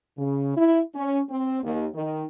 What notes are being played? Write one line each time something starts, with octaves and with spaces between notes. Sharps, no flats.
C#3
E4
C#4
C4
D#2
D#3